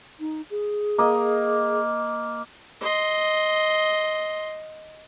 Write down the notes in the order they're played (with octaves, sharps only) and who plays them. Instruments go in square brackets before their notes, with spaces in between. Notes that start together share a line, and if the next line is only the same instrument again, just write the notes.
[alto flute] D#4
G#4
[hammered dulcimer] A#3 D#5
[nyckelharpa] D#5 C6